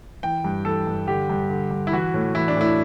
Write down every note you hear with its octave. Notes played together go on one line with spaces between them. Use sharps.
E3 G5
G2
E3 A4
G2
D3 G4
G2
D3
G2
E4
E3 F#4
A2
E3 E4
D4
A2 E4